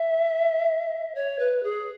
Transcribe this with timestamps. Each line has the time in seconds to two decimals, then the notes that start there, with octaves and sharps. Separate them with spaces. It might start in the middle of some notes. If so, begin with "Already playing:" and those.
Already playing: E5
1.14 C#5
1.39 B4
1.63 G#4